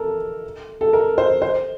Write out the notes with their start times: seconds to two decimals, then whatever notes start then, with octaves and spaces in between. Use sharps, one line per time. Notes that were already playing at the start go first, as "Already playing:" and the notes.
Already playing: A4 A#4
0.81 A4
0.93 A#4
1.18 C5
1.42 C5